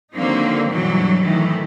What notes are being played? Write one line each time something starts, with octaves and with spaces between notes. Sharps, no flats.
D3 D#3 F#3 A#3 C4 D#4
G2 B2 E3 F#3
A2 D#3 E3 A3